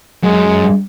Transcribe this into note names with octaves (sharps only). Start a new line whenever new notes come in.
F#2 G#3